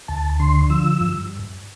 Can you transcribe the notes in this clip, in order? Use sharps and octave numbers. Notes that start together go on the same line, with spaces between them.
D2 A5
D3 C6
F3 E6
G2